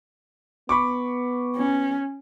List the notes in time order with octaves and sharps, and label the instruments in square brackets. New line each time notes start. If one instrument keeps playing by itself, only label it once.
[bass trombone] B3 [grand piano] B5 C#6 D6
[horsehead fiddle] C#4